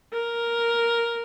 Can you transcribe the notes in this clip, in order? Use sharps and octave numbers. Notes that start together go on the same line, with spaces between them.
A#4